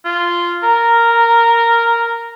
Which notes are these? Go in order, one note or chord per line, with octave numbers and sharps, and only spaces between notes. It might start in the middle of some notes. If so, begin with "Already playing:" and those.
F4
A#4 A#5